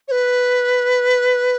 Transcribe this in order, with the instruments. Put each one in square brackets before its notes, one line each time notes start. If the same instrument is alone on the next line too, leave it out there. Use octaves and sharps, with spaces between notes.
[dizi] C#5
B4